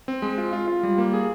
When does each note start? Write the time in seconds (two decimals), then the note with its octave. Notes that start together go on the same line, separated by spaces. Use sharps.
0.08 C4
0.22 G#3
0.38 F4
0.53 F4
0.68 F4
0.83 G3
0.98 A#3
1.13 G#4